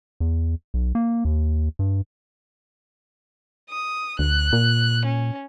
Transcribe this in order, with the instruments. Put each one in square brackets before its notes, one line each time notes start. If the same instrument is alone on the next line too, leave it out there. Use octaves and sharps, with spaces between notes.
[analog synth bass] E2
B1
A#3
D#2
G2
[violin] D#6
[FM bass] D2 [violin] F#6
[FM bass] A#2
[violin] C#4